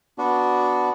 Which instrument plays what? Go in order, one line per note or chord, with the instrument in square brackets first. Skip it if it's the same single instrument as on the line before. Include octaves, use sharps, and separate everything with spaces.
[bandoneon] B3 D4 F#4